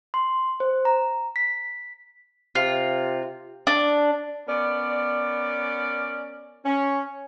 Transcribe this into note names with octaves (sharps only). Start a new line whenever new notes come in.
C6
C5
A#5
B6
C3 F4
D4
B3 C#4 A#4 D5
C#4